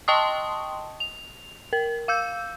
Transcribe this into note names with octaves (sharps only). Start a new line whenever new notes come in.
D#5 G5 A5 C6 C#6 D#6
F7
A#4
F5 E6 G6